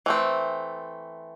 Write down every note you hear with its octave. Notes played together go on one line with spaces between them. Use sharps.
E3 A3 C4